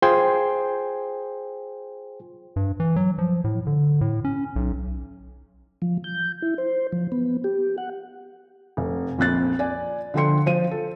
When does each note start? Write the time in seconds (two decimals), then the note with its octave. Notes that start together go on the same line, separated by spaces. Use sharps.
0.02 F4 G#4 C5 G5 G#5 C6
2.56 G2
2.80 E3
2.96 F#3
3.18 F3
3.44 A2
3.67 D3
4.01 A2
4.25 C#4
4.56 B1
5.82 F3
6.04 G6
6.42 E4
6.58 C5
6.92 F3
7.12 B3
7.44 G4
7.78 F#5
8.77 F1
9.19 A#1 F2 F#6 A6
9.59 D5 G#5
10.14 D3 F3 A4 G5 C6 C#7
10.46 F3 C5 D#7
10.71 A4